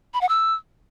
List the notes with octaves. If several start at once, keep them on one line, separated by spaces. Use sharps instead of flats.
B5
F#5
E6